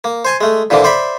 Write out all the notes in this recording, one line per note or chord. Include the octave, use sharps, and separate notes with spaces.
A#3
C5 G#5 A5
G#3 A3
A#2 D3 E3 F3 A#3
C5 D5 E5 B5